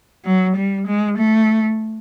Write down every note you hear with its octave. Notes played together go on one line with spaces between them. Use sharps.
F#3
G3
G#3
A3